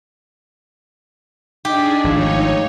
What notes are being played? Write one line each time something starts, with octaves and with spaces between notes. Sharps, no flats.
D4 D#4 G4 G#4 D#5
G#1 F3 A3 D#4 C#5 F5 E6